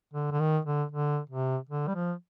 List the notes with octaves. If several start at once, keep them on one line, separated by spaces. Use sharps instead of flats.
D3
D3
D#3
D3
D3
C3
D3
G3
F3